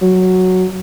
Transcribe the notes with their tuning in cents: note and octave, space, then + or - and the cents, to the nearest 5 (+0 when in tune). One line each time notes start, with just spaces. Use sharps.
F#3 +0